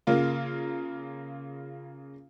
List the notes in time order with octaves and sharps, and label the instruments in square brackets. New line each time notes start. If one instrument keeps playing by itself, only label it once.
[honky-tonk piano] C#3 A#3 F4